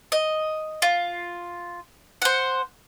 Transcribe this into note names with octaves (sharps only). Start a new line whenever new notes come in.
D#5
F4
C5 F#5